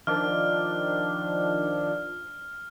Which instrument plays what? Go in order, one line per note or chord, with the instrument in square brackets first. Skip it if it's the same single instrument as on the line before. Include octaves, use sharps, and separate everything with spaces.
[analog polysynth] D#3 F3 D4 [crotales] F6